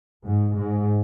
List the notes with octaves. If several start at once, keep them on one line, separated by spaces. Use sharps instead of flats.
G#2
G#2